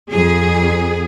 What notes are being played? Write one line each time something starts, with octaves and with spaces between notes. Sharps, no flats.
F2 G#4